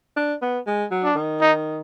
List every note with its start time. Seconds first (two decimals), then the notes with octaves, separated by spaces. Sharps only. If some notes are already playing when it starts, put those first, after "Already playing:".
0.17 D4
0.42 B3
0.67 G#3
0.91 F#3
1.04 D4
1.15 D#3
1.41 D#4